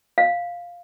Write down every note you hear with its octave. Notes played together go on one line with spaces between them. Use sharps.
F5